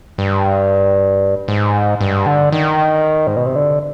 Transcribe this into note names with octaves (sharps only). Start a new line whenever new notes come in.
G2
G#2
G2
D3
D#3
G#2
B2
C3
D3